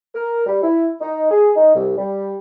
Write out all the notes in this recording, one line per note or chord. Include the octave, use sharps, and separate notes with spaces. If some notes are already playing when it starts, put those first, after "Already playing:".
A#4
G3
E4
D#4
G#4
D#4
C2
G3